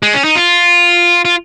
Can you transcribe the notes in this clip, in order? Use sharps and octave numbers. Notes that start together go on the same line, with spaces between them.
G#3
C#4
D#4
F4
F4